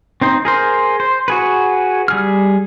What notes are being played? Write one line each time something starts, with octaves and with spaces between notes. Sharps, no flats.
C4 D#4 C5
G#4 A#4 C5
C5
F#4 G#4 B4
G3 G#4 F6